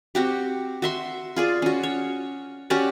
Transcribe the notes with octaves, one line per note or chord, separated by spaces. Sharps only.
C4 F#4 G4
F#4 E5 C6
F4 G#4 D5
C#4 F#4
C#5
C#4 F#4 G4 D5